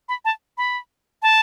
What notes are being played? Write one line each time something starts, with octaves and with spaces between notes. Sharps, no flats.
B5
A5
B5
A5